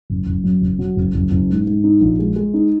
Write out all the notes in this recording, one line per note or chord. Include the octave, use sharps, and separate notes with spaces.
F#1
F#1
F#2
F#1
F#3
F#1
F#1
F#1
G#2
G#2
D#4
A#1
G#3
G#3
D#4